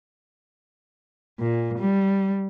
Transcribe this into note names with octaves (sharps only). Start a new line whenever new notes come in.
A#2
G3